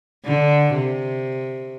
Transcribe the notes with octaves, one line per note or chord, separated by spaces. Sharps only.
D3
C3